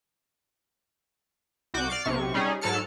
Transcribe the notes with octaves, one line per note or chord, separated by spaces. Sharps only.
C2 F#4 D6 G6
D5 F6 A6 C7
B1 C3 C#6
G3 C#4 D#4 G#4
G#2 F#3 A4 A5 F6 C#7